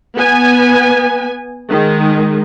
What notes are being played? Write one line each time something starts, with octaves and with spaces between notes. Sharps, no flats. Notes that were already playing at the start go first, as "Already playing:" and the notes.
B3 G#5
D#3 G#3